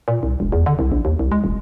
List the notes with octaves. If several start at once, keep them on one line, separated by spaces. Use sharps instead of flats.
A#2
C2
E1
E2
D3
C2
A#1
D#2
C2
G#3
D#1